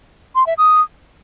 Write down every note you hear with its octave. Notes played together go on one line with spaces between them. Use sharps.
C6
E5
D#6